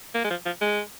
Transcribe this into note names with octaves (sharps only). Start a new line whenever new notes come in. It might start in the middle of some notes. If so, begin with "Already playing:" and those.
A#3
G#3
F3
F3
G#3